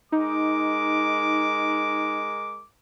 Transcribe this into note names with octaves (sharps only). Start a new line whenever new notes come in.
G#3 D#4 A#4 D6